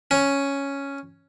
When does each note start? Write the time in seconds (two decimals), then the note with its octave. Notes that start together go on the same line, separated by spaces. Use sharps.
0.11 C#4